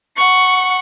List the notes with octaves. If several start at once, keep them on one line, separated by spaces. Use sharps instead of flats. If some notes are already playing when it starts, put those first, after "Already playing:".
F#5 C#6